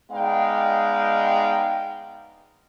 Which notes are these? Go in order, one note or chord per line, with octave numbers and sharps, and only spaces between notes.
G#3 B3 D#4 D5 F5 G5